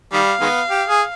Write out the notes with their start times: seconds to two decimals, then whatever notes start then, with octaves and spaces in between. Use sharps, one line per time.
0.12 D#3 G3 F5
0.41 D#3 G#3 B3
0.70 G4
0.88 G#4